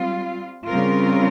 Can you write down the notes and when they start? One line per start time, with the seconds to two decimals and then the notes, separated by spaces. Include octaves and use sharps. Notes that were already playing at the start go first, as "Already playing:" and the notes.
Already playing: G3 C4 F4
0.67 C#3 G3 C4 F4 A#4